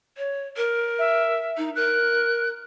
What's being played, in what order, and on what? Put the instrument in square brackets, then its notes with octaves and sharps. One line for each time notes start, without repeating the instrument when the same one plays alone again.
[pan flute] C#5
A#4
[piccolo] E5
[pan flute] D#4
[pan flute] A#4 [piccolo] F#6